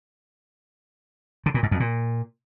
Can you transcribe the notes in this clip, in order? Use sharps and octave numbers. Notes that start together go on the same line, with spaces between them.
D3
A#2
G#2
F2
A#2